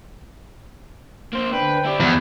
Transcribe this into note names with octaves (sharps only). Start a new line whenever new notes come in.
A#3 C5 C6
D3 D4 B4 C5 G5
E4 G4 D5
E2 F3